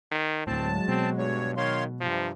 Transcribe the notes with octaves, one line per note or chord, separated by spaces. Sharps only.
D#3
D2 A2 F#3 G#3 C4 A5
B2 C4
G2 C#5
D#3 C#5 F5 C6
G2 C3 F3